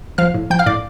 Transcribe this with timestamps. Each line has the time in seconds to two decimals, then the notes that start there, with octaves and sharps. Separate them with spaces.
0.18 F3 F5 F6
0.34 A2
0.50 F3 G5 G6
0.59 F5 F6
0.66 A2 D5 D6